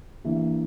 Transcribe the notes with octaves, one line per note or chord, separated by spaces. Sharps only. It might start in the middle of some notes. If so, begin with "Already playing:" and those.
G2 E3 A#3 E4